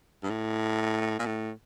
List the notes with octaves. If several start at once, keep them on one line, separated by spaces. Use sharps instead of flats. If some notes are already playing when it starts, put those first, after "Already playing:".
G2
A2
A#2
A2